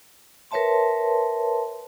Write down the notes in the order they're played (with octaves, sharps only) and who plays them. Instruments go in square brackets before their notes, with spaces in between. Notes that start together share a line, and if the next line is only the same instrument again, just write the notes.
[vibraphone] A#4 B4 C#5 E5 A5 C6